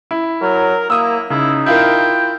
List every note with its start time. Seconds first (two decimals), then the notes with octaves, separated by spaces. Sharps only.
0.11 E4
0.42 F#3 A#4
0.90 A#3 E4 D#6 E6
1.30 C#3 D#4 E4
1.66 E4 F4 A#4 G5